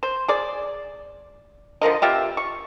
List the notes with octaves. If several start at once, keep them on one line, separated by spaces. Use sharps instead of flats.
C5
G#4 D5
D3 F3 A#4 D#5
B2 F4 G4 E5
C#6